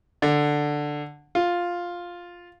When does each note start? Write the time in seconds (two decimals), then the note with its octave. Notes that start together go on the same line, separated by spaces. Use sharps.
0.22 D3
1.35 F4